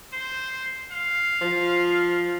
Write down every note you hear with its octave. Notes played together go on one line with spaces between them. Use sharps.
C5
F5
F3